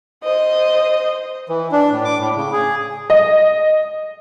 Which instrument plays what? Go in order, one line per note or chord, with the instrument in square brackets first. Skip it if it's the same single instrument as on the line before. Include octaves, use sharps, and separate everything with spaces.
[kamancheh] C5 D#5
[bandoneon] E3
D4
A2
D6
A2
C#3
G#4
[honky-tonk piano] D#5